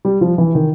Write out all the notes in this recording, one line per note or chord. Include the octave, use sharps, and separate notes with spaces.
G3
F3
E3
D#3